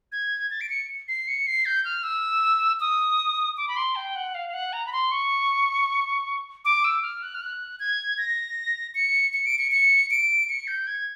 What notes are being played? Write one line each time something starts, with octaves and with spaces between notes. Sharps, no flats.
G#6
A6
D7
C#7
C7
C#7
C7
G6
F6
E6
D#6
D6
B5
C6
G5
F#5
F5
F5
F#5
A#5
B5
C6
C#6
D6
E6
F6
F#6
F6
F#6
G#6
A#6
C#7
C#7
D7
C#7
C#7
D7
C#7
G6
G#6